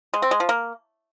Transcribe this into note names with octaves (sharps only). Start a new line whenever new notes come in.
G#3
C4
G#3
F3
A#3